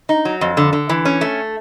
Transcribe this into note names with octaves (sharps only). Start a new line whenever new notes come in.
D#4
F#3
F2
D3
D3
E3
C#4
A3